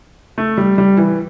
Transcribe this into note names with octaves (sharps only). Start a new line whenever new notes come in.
A3
G3
G3
E3